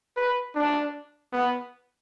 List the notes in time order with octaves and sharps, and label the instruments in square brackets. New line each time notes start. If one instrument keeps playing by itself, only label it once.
[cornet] B4
D4
B3